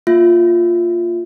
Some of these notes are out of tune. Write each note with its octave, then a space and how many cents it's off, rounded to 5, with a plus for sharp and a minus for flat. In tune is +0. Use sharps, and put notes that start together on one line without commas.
A#3 +0 F4 +0 E5 +0